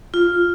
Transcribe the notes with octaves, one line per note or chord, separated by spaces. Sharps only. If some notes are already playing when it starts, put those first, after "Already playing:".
F4